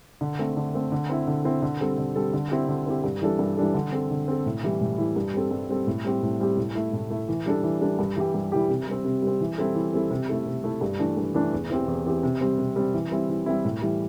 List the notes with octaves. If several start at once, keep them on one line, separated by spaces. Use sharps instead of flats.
D3
A3 C4
D3
A3 C4
D3
C4 E4
D3
C4 E4
D3
G3 C4 A4
D3
G3 C4 A4
D3
C4 E4 G4
D3
C4 E4 G4
G2
E3 G3 D4 A4
G2
E3 G3 D4 A4
D3
C4 A4
D3
C4 A4
A2
E3 G3 E4
A2
E3 G3 E4
G2
G3 C4 A4
G2
G3 C4 A4
A2
G3 C4 G4
A2
G3 C4 G4
A2
A3 E4
A2
A3 E4
E3
G3 D4 A4
E3
G3 D4 A4
G2
E3 G3 E4 G4
G2
E3 G3 E4 G4
C3
G3 C4
C3
G3 C4
E3
G3 C4 E4 A4
E3
G3 C4 E4 A4
C3
A3 E4 A4
C3
A3 E4 A4
G2
E3 A3 D4
G2
E3 A3 D4
E2
E3 C4 G4
E2
E3 C4 G4
C3
G3 C4
C3
G3 C4
E3
G3 C4 E4
E3
G3 C4 E4
A2
E3 G3